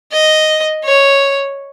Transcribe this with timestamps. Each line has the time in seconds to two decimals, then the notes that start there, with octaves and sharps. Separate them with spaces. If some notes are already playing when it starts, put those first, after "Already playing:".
0.12 D#5
0.84 C#5